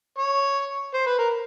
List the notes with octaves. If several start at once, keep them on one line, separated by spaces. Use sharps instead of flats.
C#5
C5
B4
A#4